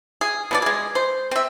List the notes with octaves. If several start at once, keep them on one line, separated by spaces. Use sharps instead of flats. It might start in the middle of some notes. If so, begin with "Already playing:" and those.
G#4
B2 D4 D5
G#3 G#4
C5
C4 E5